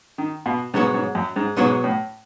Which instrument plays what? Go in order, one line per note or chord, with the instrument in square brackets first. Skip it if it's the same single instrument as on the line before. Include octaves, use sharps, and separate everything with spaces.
[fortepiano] D#3
B2
[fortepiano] G#2 [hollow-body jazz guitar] B2 F#3 B3 F#4 C#5
[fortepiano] G#2
F#2
G#2
[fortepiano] G#2 [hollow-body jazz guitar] B2 F#3 B3 F#4 C#5
[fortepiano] A2